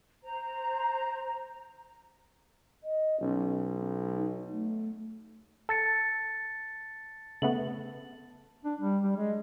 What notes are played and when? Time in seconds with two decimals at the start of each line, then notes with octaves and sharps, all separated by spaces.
0.23 C5 A#5
2.84 D#5
3.21 B1 C#4
4.13 D#4
4.52 A3
5.69 A4 A5 A6 C#7
7.42 C#3 A3 B3 F#7
8.65 D4
8.81 G3
9.04 G3
9.16 G#3